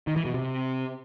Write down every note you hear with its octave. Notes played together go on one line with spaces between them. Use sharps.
D#3
E3
B2
C3